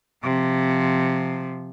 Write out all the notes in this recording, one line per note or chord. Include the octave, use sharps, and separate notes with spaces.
C3 F3